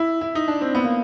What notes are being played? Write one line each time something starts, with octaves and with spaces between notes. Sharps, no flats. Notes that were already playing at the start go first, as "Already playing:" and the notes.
Already playing: E4
E4
D#4
D4
C4
B3
A#3